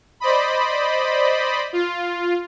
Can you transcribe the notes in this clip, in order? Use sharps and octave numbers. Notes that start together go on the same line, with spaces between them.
C5 D5 D#5 B5
F4